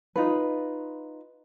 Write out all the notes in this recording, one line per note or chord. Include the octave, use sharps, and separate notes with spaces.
D#4 F4 B4